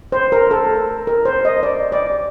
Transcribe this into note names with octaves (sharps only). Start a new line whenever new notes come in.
C5
A#4
A4
A#4
C5
D#5
D5
D5